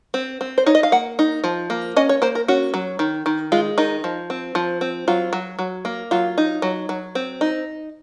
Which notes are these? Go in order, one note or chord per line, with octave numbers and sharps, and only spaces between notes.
C4
C4
C5
D#4 C#5
D#5
F5
A#3 F#5
D#4
F3
A#3
C#4 D#5
C#5
A#3 C5
A#4
C#4 F#4
F#3
D#3
D#3
G#3 F4
D#3 D#4
F3
C4
F3
C4
F#3 F4
F#3
F#3
A#3
F#3 F4
D#4
F#3
F#3
C4
D#4